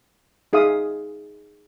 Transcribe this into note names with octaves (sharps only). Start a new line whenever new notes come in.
D#4 G#4 E5 F5 D#6